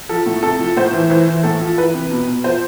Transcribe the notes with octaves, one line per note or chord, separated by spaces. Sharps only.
F3 A4
A2
C3 A4
F3
A2 C5
E3
E3
E3
A2 A4
F3
E3 B4
C3
B2
B2
F3 C5